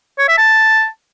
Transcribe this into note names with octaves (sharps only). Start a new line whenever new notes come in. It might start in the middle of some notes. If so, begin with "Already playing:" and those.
C#5
E5
A5